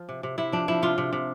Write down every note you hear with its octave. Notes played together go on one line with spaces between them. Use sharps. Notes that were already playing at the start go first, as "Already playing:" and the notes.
Already playing: F3 F4
C3
C3
C3 E4
F3 D4
F3 E4
C3 F4
C3
C3